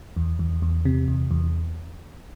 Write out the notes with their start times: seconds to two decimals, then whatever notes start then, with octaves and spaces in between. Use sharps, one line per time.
0.17 E2
0.39 E2
0.62 E2
0.85 C3
1.08 E2
1.31 E2